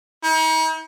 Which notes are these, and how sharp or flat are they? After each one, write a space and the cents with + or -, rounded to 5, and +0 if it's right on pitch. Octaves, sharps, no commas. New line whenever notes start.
D#4 +45